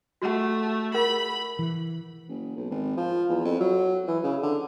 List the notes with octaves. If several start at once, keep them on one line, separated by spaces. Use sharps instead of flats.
A3 F#4 F#5
G#4 A#4 F#5 B5
E3
F#1
B1
G#1
F3
E2
F2
F#3
E3
C#3
D3